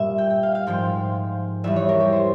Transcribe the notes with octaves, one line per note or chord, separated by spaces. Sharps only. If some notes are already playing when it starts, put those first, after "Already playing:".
Already playing: G2 A#2 G3 E5
G5
G5
F5
F5
G#2 F3 G#3 G5
E2 E3 G3 E5
C#5
A#4
G4
C5